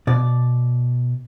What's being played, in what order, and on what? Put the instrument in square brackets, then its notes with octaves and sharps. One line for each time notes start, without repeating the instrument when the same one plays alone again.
[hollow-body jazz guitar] B2 D5